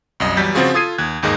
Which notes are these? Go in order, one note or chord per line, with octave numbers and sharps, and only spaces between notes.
C2 F#2 D#5
E2 F#3 G3 G6 B6
C#3 F3 C4 F4 F#4 G#4
F4 A4 D#6 G#6 C7 D#7
D#2 F#6 G#6
G1 D#2 G#2 A#3 G#4 D#5